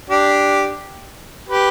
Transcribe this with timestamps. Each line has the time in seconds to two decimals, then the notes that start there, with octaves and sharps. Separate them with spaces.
0.09 D4 G4
1.49 G4 B4